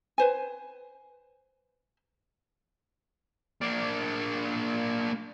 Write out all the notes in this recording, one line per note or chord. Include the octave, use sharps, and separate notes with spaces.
B4 C5 G#5
A#3 D4